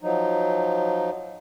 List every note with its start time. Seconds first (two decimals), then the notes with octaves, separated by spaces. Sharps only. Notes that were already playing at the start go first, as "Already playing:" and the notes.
0.01 F3 F#3 D#4